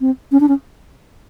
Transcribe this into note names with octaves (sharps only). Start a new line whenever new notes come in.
C4
C#4
D4
C#4